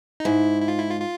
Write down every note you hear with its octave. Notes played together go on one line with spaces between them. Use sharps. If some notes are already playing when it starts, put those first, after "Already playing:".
D#4
G#2 E4
E4
F4
E4
F4
F4